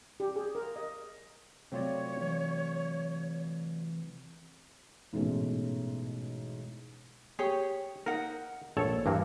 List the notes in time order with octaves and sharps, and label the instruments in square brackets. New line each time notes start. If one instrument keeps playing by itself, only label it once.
[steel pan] G4
G#4
A#4
D#5
[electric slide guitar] C3 F#3 A3 [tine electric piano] C4 F4 D5 [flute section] C#5
[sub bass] E3
[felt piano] A1 G#2 B2 G#3 A3 C#4
[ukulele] G4 C#5 [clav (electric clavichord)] G#4
[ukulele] D#4 F#5 [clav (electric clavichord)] A#4
[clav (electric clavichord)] A#1 A4 C#5
G2 E3 A#3